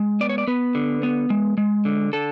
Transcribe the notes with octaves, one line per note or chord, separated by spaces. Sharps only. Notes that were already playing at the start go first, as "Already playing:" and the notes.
Already playing: G#3
B3 D5
C#5
D5
B3 B4
D3
B3
G#3
G#3
D3
D3 A4